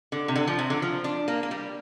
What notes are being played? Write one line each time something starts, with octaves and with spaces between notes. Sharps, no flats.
D3
C3
D3
F3
C3
D3
F3
D4
A#3
A#3
G3